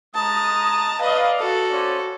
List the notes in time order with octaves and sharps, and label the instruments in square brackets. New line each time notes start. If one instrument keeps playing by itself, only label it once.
[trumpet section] G#3 D#6 [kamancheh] A5 A#5
[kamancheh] B4 D#5 [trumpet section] D5 F5
[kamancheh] F#4 A4
[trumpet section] C#4 C5 D5